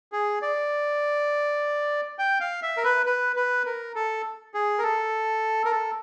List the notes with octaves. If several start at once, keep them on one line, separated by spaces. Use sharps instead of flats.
G#4
D5
G5
F5
E5
A#4
B4
B4
B4
A#4
A4
G#4
A#4
A4
A#4
A4